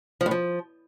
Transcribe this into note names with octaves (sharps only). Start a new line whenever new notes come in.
F3
A2
F3